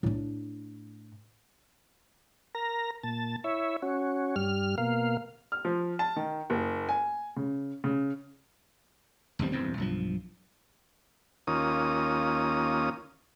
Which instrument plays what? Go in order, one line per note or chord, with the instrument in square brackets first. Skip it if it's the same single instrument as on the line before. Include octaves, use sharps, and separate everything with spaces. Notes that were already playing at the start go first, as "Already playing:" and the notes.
[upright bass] A2 D4
[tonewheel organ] A#4 A#5
A#2 A5
E4 C#5 E5
C#4 F#4
G2 G3 F6
B2 A#3 F5
[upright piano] F6
F3
A5
D#3
F#1
G#5
C#3
C#3
[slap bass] F1 D#2 G3 C4
D#1 E2 G2 C4
B1 G2 F3
[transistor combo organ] D#2 A#3 C#4 F4 D#6